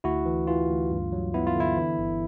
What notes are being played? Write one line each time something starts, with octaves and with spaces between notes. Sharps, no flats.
D2 E4 F#4
E3
E3 F4
D2
G2
F#3
B3 E4
F4
D3 E4
E3
G1